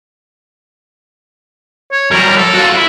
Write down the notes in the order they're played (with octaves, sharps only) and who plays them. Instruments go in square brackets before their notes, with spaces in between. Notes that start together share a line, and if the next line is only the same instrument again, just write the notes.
[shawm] C#5
[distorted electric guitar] F#3 G3 [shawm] A#4
[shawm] A4
[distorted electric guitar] F4 F#4
E4